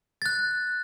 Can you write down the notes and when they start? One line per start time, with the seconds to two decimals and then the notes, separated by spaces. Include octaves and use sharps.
0.22 F#6 A6